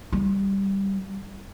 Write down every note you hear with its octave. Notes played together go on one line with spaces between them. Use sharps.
G3